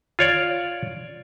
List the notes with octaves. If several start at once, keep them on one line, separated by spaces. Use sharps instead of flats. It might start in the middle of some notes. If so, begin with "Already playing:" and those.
F4 C#5 D5